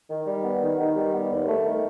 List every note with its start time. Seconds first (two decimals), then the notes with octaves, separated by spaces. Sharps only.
0.09 D#3
0.27 G3
0.44 B3
0.61 D#3
0.78 D#3
0.96 G3
1.13 B3
1.30 D#2
1.47 A3
1.65 D#3